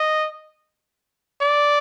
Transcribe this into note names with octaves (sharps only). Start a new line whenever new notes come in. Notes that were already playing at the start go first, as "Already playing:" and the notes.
Already playing: D#5
D5